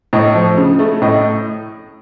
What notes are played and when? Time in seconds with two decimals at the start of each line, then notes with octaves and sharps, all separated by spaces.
0.13 A2 D#5
0.35 F3
0.57 C#3
0.79 A3
1.02 A2 D#5